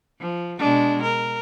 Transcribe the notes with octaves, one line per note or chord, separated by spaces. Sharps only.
F3
B2 G#3 D4
A#4